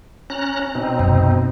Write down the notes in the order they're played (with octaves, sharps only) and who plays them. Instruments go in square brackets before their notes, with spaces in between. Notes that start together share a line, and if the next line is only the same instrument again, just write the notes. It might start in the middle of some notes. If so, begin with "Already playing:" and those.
[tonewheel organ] C#4 A#5 F#6
B2 C4 D#4
[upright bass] F#2 C3